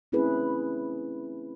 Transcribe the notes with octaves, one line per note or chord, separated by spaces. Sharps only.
A3 C4 C#4 E4 G#4 B4